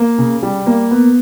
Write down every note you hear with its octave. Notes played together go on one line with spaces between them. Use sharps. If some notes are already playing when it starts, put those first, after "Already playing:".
Already playing: A#3
C#3
G3
A#3
B3